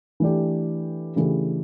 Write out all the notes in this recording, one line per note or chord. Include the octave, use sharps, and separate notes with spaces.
E3 A3 D4 G4
C#3 E3 A3 D4 G4